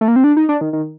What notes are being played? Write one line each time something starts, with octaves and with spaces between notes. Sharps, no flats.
A3
A#3
C4
D4
D#4
D4
D#3
D#3